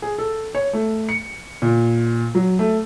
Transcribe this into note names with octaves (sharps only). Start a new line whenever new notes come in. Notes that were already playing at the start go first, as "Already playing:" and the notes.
G#4
A4
C#5
A3
C#7
A#2
F#3
A3